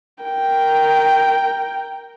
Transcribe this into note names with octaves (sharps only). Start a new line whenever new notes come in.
A#4 G5